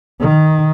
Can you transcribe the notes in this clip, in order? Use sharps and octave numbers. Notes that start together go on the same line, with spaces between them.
D#3